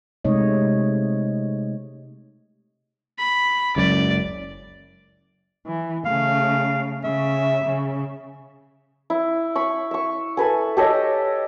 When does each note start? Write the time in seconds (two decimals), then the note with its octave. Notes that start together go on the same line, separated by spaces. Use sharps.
0.25 C3 G#3 A3 D#4 C#5 D#5
3.18 B5
3.76 F#1 C#2 F#2 D5
5.67 E3
6.06 C#3 A3 F5
7.04 C#3 E5
7.64 C#3
9.10 E4
9.55 B5 C#6
9.91 E5 C#6
10.37 A4 B4 G#5
10.77 G4 A4 C#5 D#5